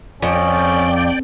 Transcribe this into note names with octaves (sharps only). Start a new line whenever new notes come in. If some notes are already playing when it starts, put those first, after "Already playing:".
F2 C#4 D5 G5